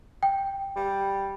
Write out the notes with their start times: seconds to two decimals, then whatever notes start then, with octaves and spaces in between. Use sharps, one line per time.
0.23 G5
0.76 G3